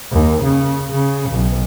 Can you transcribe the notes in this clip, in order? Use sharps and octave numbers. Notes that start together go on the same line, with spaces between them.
D#2
C#3
C#3
B1